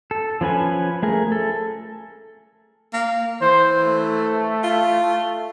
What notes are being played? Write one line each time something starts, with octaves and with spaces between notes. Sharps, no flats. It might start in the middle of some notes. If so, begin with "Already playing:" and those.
A4
F3 C#4 B4 G#5
A3 G#4 A#4
A4
A#3
E3 C5
A3
F4